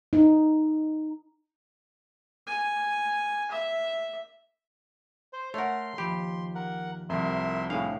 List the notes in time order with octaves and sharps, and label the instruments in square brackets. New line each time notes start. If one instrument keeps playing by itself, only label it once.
[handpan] D#4
[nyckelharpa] G#5
E5
[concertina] C5
[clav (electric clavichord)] A3 A#4 [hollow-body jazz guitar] C#5 F#5 [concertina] C6
[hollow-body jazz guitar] D#2 F3 B5 [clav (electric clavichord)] G4
[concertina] A#4 F#5
[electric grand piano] C2 F2 [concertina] A#4 E5 C6
[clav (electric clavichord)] A2 F5 [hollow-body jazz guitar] D4 [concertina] G#4